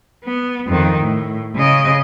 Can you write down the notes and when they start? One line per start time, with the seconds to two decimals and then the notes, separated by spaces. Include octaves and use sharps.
0.25 B3
0.67 F2 D#3
1.02 A2
1.56 C#3 D#5